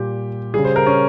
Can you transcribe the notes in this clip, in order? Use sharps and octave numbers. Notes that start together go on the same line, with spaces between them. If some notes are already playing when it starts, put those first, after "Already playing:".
Already playing: A#2 G3 G4
C#3 G3 G#4
C5
A#4
C#4